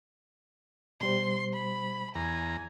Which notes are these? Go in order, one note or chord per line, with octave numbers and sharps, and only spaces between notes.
B2 G3 C5 C6
B5
E2 G#5 A#5